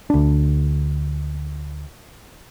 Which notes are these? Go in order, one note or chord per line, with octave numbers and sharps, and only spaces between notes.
D2 D4